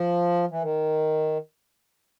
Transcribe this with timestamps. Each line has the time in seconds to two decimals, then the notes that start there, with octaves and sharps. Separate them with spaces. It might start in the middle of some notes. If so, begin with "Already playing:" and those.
Already playing: F3
0.51 E3
0.62 D#3